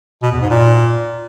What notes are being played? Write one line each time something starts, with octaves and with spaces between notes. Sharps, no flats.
B2
E2
G#2
A#2